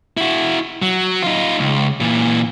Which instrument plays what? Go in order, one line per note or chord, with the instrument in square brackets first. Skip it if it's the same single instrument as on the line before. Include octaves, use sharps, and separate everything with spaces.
[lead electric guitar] E4 F#4
F#3
D#4 F4
C#2
A#2 E3